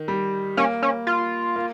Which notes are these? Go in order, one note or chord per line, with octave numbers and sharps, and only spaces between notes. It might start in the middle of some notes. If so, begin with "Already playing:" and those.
Already playing: D#3
G3
A#3 C#4
C#4
F4
A#3